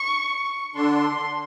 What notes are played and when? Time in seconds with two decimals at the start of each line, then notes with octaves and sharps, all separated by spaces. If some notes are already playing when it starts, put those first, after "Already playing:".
Already playing: C#6
0.75 D3 D4 C6